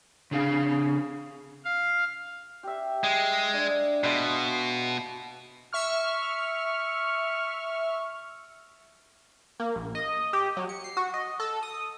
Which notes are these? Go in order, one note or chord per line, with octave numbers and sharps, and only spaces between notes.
C#3 D4 G#4 F5
F5
G4 E5
G#3
D4
B2 G#3 F5
E5 C#6 F6
A#3
A#1
D#5
G4
F#3
C#7
C7
F#4
D#5
A4
D#6